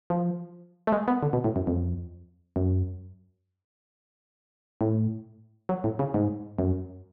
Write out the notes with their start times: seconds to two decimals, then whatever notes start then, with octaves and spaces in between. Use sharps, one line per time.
0.10 F3
0.87 A3
0.92 G#3
1.08 B3
1.23 D3
1.33 B2
1.44 A2
1.56 F#2
1.67 F2
2.56 F#2
4.81 A2
5.69 F#3
5.84 A2
5.99 C#3
6.14 G#2
6.59 F#2